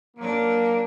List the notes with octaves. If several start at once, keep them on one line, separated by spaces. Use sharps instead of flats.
F#3 A#3 D4